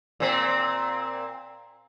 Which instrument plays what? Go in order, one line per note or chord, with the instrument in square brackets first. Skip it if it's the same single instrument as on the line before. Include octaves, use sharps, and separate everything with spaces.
[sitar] A#2 C4